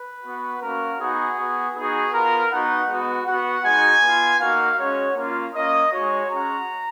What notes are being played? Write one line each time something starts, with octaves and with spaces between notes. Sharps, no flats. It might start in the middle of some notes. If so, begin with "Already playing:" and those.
Already playing: B4
B3 F#4
A#3 C#4 F#4 A#4
B3 D#4 F#4 G#4
B3 F#4
B3 D#4 F#4 G#4
B3 F4 A#4
B3 D#4 F#4 F#5
G#3 B3 F#4
B3 F#4 F#5
G#3 D#4 F#4 G#5
B3 F4
A#3 D#4 F#4 F5
G#3 C#4 F#4 C#5
A#3 C#4 F4
A#3 C#4 F4 D#5
G#3 D#4 F#4 C#5
G#3 C#4 F#4 A#5